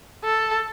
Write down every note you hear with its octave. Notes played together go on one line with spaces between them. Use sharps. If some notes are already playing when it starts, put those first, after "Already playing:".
A4